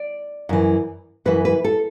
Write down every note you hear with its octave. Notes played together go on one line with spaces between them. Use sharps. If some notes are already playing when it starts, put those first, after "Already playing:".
Already playing: D5
F#2 E3
F#2 E3 B4
B4
A4